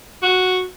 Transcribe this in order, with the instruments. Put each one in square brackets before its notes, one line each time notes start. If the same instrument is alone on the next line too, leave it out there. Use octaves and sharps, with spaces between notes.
[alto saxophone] F#4